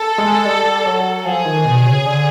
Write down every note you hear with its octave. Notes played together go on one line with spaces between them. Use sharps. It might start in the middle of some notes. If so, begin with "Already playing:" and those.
Already playing: A4
G#3
G3
F#3
F3 G#4
D#3
B2
C#3
D3